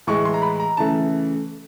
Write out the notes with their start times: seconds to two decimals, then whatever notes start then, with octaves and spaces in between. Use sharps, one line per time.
0.07 A2 E3 G#3 C#6
0.25 C6
0.34 A#5
0.42 B5
0.60 A#5
0.77 C#3 E3 A3 A5